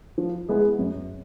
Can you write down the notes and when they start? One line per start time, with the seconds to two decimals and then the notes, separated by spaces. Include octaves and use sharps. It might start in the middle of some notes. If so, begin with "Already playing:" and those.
0.18 F3
0.48 G#3 B3 E4 G#4
0.79 F#2